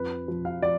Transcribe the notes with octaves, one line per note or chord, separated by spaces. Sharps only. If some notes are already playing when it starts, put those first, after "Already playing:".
Already playing: F2 B4
F3
F5
F3 D5